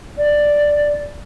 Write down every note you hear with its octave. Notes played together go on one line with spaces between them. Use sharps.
D5